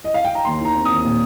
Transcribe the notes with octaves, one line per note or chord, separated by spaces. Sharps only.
D#5
F5
G5
A#5
D#2 C6
D#3 A#5
C4
D#2 D#6
A#2